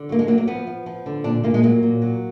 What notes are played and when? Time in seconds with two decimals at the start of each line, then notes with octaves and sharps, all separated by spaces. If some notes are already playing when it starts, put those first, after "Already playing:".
Already playing: D3
0.09 F#3 A#3
0.19 G#3
0.28 F#3 A#3
0.38 A#3
0.47 F3 B3
0.67 F3
0.86 F3
1.06 D3
1.24 A#2 D4
1.43 A#2 A#3
1.54 G#3
1.63 F#3 A#3
1.83 A#2
2.02 F#3